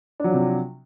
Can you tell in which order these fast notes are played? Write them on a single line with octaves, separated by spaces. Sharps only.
D4 F#3 F3 C3